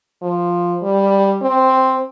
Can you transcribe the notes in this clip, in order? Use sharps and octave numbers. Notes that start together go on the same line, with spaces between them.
F3
G3
C4